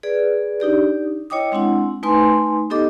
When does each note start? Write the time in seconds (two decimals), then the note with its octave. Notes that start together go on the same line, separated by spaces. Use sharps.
0.03 G#4 B4 D5
0.60 D4 D#4 G4 D5
1.30 E4 C#5 D#5 G5 D6 D#6
1.52 G#3 C4 D4 E4 F#5
2.03 A3 D#4 B4 G#5 C6
2.70 B3 D#4 G4 A4 D#5 D6